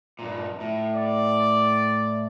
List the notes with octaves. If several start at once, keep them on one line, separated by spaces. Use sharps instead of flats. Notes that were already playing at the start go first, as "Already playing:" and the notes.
G2 A#2
A2
D5